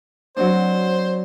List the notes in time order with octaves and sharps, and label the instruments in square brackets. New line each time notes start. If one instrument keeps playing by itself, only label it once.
[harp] F#3 C4 D4 [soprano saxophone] C5